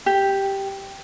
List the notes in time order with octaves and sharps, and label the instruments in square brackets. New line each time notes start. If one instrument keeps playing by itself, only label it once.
[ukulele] G4